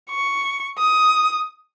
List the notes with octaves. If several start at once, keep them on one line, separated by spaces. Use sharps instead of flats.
C#6
D#6